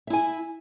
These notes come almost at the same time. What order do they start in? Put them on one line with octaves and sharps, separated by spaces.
E5 E4 G#5